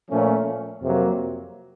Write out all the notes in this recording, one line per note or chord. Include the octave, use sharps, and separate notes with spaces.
A#2 F3 A3 C#4
F2 C3 F#3 A#3